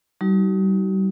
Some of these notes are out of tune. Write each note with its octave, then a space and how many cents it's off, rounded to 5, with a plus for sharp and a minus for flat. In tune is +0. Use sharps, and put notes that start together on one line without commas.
G3 -35 D#4 +30 F#4 +45